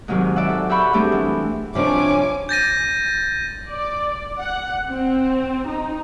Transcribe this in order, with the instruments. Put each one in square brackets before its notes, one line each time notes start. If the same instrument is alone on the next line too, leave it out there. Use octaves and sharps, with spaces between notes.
[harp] G#2 C3 D#3 F#3 G#3
D5 E5 F#5
A4
G4 E5 F#5 B5 C#6
G3 A3 C4 D4 G4 G#4
E3
[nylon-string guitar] C3 D4 [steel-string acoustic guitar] F3 G3 [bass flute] C#5 [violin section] G#5 D6
[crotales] G6 A6 A#6 D#7
[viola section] D5
F#5
C4
D#4